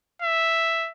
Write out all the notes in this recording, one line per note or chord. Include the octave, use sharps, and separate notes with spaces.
E5